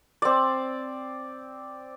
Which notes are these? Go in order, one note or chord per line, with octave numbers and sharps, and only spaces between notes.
C4 D5